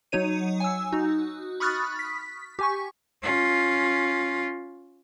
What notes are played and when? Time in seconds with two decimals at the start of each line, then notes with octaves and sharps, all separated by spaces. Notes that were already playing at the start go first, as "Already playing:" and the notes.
0.12 F#3 D#4 C#5 D#7
0.60 G#5 E6
0.92 D#4 F#4
1.60 B5 C#6 D#6 F6 F#6 A6
1.99 B6
2.59 G4 G#5 C#6
3.22 C#4 F4